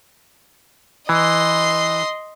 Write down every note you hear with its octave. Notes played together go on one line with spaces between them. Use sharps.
E3 D#5 C6